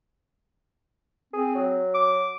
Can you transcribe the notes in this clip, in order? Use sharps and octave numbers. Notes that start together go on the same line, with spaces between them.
C4 G#4
F#3
D6